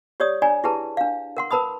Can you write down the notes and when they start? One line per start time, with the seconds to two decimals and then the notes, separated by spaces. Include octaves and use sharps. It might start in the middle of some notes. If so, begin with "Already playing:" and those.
0.20 G4 C#5 D5 D#6
0.42 D4 D5 G#5 A#5
0.64 E4 G4 G#4 B4 A5
0.97 D4 F5
1.37 A#4 F#5 C6
1.51 A#4 B4 A5 B5 D#6